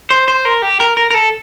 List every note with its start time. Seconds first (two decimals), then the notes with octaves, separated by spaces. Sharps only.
0.10 C5
0.28 C5
0.45 A#4
0.62 G4
0.80 A#4
0.97 A#4
1.10 A#4
1.14 A4